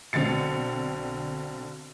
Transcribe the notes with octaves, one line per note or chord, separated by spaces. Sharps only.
B1 D3 C4 A6 C#7